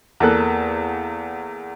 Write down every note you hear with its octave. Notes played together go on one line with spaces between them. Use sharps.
E2 A#3 A4 F#6